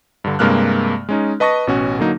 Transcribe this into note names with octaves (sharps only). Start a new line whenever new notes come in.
G2 D3
G2 C3 G#3 A#3 F6 F#6
G#3 C#4 D#4
B4 D#5 A5 C#6 D#6 A#6
A1 B2 C#4 F#4
D3 F#3 A#3 D#4